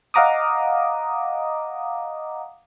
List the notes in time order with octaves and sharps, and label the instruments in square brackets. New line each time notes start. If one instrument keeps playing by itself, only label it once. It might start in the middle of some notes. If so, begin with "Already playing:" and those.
[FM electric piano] D#5 F5 F#5 A#5 D6 D#6